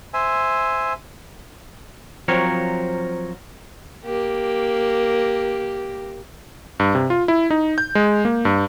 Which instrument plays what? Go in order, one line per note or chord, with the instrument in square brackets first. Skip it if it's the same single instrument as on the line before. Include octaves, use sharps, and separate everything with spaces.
[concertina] C5 E5 G#5
[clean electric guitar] F3 F#3 C4 A#4 C#5
[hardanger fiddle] A#3 G4
[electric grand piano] G2
C3
F4
E4
D#4
G6
G#3
A#3
G2